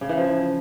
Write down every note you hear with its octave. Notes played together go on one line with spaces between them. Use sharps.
C#3
E3
F3